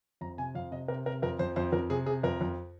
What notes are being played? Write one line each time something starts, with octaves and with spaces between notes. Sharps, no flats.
F2 A#5
C3 G#5
F2 F5
C3 D#5
C3 A#4
C3 A#4
F2 A#4
F2 C5
F2 C5
F2 A#4
C3 G#4
C3 G#4
F2 A#4
F2